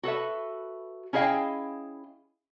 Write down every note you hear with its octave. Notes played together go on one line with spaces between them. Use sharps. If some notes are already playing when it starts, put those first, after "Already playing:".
F#4 A4 B4 E5
C#4 E4 G#4 D#5 F5 G5